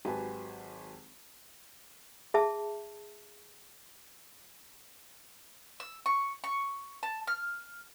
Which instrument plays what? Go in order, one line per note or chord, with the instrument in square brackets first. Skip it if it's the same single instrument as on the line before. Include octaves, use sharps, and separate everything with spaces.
[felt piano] G#1 F#3 G4 B4 G#5 A5
[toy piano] G#4 E5 A5
[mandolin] E6
C#6
C#6
A5
F6